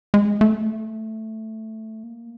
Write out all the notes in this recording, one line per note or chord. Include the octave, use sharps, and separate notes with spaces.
G#3
A3
A#3